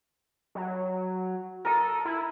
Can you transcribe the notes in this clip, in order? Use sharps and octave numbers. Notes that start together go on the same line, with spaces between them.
F#3
A4 A#4 D#6
E4